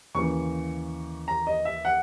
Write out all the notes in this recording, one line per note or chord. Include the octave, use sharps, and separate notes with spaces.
D#2 C#3 E3 C#6
A#5
D#5
E5
F#5